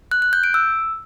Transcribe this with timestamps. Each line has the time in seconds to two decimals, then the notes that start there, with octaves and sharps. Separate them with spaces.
0.11 F#6
0.22 F#6
0.33 G6
0.44 D7
0.54 E6